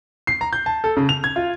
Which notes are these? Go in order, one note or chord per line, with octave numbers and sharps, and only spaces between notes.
C7
A#5
G6
A5
A4
C#3
F7
G#6
F4